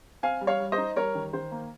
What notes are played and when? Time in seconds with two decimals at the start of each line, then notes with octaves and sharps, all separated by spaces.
0.23 C4 F5 G#5
0.41 G3
0.47 C#5 F5
0.60 G3
0.72 C5 D#5
0.78 D#4
0.96 G3 A#4 C#5
1.15 D#3
1.33 D#3 C5
1.51 A#3